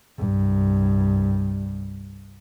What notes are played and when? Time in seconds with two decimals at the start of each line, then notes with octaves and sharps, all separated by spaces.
0.18 C2 G2